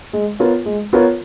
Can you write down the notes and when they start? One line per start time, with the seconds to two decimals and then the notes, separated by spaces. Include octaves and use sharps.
0.13 G#3
0.39 B3 F4 A#4 C#5
0.66 G#3
0.93 B3 F4 A#4 C#5